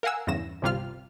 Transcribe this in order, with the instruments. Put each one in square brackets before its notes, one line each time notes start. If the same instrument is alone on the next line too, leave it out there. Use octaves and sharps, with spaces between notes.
[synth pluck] A#4 F5 F#5 G#5 E6
E2 G2 C#3 A#6 E7
G1 C2 C3 G3 F4 F6